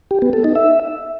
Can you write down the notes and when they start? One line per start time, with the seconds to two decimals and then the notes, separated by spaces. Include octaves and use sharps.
0.11 G4
0.22 B3
0.33 A4
0.44 D#4
0.56 E5